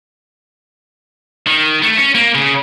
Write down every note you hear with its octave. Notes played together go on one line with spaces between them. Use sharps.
D#3
A3
C#4
A#3
C#3